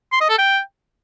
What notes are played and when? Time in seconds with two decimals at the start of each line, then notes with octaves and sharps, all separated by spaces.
0.12 C6
0.21 D#5
0.30 A4
0.38 G5